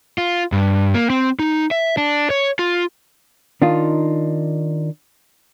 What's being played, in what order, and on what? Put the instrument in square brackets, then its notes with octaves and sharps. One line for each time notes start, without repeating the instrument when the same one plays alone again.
[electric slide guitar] F4
G2
A#3
C4
D#4
E5
D4
C#5
F4
[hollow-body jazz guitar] D#3 D4 D#4 F4